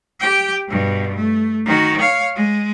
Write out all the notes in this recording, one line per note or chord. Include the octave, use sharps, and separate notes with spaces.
G4 G5
G2 B2
A3
D#3 F#4
C#5 F5
G#3